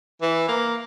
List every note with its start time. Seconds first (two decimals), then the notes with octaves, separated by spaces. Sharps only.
0.22 E3
0.48 A#3